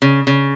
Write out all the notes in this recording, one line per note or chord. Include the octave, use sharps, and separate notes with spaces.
C#3
C#3